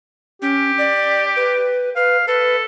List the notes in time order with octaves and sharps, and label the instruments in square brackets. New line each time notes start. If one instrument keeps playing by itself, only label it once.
[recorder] C#4 [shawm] G4
[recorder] D5
B4
[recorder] B4 [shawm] F5
[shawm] A4 [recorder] B4